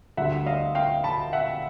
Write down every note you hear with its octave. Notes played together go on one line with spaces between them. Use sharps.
D2 D3 G3 E5 F#5
D#5 F5
F5 G5
A5 B5
E5 F#5